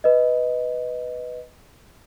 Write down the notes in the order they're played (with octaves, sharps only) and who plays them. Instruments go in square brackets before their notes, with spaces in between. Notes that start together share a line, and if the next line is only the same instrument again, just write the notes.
[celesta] B4 D#5